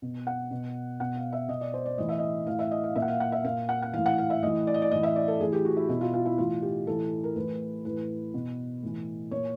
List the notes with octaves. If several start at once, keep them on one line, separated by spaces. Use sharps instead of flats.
B2
F#5
B2
B2 F#5
F5
E5
B2 D#5
D5
C5
D5
A2 E3 D#5
E5
D#5
A2 E3 F5
E5
D#5
F5
A#2 E5
F#5
F5
F#5
E5
A#2 F5
F#5
F#5
A2 E3 F5
F#5
F5
E5
A2 E3 D#5
D5
D#5
D5
A2 E3 D#5
E5
D5
A4
A2 E3 G#4
G4
F#4
E4
B2 E4
F4
F4
E4
A2 E3 F4
G4
A2 E3 A4
A#4
A2 E3 B4
A2 E3 B4
B2
A2 E3
A#2 C#5